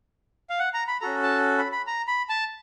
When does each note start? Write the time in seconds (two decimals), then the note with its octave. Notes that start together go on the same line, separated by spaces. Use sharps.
0.50 F5
0.59 F#5
0.74 A#5
0.88 B5
1.01 C#4 F#4 A4 A#5
1.23 A5
1.58 B5
1.72 B5
1.87 A#5
2.08 B5
2.29 A5